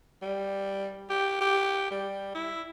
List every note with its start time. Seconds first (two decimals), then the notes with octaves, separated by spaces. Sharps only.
0.22 G3
1.10 G4
1.41 G4
1.91 G3
2.35 E4